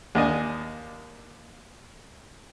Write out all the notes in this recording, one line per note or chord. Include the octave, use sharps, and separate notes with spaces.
D#2 D4 D#5 G#5